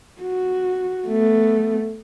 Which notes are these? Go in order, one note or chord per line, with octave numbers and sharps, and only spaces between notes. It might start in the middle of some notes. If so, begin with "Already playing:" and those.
F#4
A3 B3